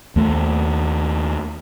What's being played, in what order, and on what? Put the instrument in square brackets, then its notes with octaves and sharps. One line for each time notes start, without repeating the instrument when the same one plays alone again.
[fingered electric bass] D#2 A3